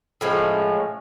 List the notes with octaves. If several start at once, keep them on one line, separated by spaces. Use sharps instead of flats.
A2 F3 G#3 C#4